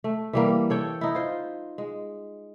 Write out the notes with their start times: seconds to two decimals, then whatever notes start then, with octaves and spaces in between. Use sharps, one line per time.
0.04 A3
0.33 E3 G3 A#3
0.70 A4 C#5 G5
1.01 D#4 E4
1.15 F4 C5
1.78 G#3